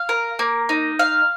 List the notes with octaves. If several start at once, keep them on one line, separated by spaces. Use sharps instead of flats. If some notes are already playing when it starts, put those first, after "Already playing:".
Already playing: F5
A#4
A#3
D#4
F5